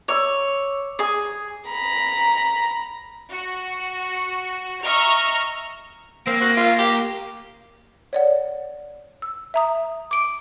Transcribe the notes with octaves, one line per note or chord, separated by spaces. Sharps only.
C#5 D6 E6
G#4 D#6
A#5 B5
F#4
D#5 E5 A#5 C#6 F6
A#3 C4
F#4
F4
G4
C#5 D5 F#5
E6
E5 A#5 D#6
D6 D7